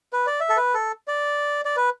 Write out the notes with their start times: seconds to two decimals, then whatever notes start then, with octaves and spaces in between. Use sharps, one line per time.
0.13 B4
0.27 D5
0.40 E5
0.49 A4
0.57 B4
0.74 A4
1.08 D5
1.65 D5
1.77 B4